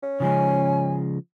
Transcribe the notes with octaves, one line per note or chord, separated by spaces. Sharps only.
C#4
C#3 F3 G#3 G#5